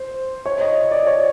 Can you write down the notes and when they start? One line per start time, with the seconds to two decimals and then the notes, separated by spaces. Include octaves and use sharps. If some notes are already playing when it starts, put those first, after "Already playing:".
Already playing: C5
0.46 C#5
0.61 D#5
0.91 D5
1.07 C#5